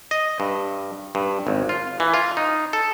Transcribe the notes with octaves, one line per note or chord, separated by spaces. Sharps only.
D#5
G2
G2
G#1
F4
E3
F4
D#4
A4